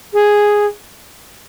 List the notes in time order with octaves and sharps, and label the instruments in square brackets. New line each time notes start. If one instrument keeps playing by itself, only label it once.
[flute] G#4